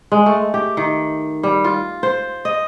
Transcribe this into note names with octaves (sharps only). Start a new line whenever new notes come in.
G#3
A3
G4
D#3
G3
F4
C5
D#5